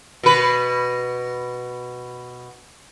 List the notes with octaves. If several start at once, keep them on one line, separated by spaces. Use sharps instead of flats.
B2 B4